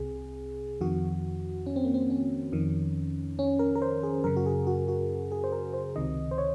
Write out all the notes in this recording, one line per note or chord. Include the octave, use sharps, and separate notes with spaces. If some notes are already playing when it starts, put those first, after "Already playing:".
Already playing: C2 C3 G#4
F2 D#3 F#4
C#4
C4
A#3
C4
C#4
F2 D#3
C#4
A#4
A#4
C5
G#4
F#2 C#3 A#4
F#4
G#4
F#4
F#4
G#4
C5
A#4
C5
C#2 C3 D#3 D#5
C5
C#5